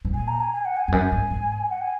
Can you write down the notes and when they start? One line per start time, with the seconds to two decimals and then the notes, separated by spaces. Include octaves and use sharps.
0.05 G#2
0.14 A#2 G#5
0.27 A#5
0.40 G#5
0.53 G#5
0.65 F#5
0.76 G#5
0.88 F2
0.92 F#2 G#5
1.12 G#2
1.30 G#2
1.70 F#5
1.81 G#5